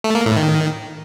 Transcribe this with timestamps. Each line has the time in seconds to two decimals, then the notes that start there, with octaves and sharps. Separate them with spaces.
0.04 A3
0.15 A#3
0.26 A2
0.36 D#3